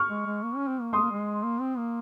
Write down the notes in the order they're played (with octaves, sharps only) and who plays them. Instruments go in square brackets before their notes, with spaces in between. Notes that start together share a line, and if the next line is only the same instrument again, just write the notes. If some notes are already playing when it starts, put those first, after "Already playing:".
Already playing: [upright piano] C#6 F6
[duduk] G#3
G#3
A#3
C#4
C4
A#3
[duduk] G#3 [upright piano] C6 D#6
[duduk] A#3
G#3
A#3
C4
A#3